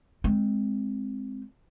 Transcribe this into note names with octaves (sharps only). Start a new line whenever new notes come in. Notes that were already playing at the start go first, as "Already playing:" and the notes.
G#3 C4